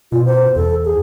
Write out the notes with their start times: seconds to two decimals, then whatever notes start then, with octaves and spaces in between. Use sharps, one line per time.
0.12 B2 F4
0.25 C5
0.56 E2 A4
0.85 G#4